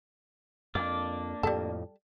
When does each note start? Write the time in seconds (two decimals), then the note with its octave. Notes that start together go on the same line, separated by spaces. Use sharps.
0.75 F2 A#3 D4 D5
1.43 F2 A2 G3 A4